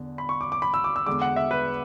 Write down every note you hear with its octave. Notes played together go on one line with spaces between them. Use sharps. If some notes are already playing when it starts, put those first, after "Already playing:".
Already playing: E2 D3
B5
C#6
D6
D6
B5
E6
D6
E6
E2 D3 G#3 D6
F#5
E5
B4